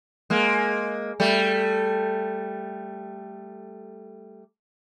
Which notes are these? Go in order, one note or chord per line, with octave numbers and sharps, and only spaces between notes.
G#3 A#3
G3 A3